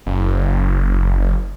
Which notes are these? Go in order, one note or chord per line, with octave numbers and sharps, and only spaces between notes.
F#1